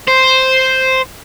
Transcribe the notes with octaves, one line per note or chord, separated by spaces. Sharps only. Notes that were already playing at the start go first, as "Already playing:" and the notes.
C5